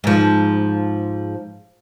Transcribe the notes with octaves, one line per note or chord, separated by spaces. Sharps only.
G#2 F3